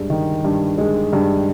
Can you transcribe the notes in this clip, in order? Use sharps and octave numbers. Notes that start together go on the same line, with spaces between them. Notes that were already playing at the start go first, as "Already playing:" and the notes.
Already playing: G2 G#3
D#3
G2
G#3
G2